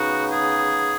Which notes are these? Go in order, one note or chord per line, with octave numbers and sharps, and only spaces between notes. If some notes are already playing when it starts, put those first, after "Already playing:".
Already playing: C#3 B3 D#4 F#4
G#4